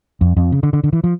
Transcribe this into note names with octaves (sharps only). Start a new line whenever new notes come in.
F2
F2
C#3
D3
D3
D3
E3
F3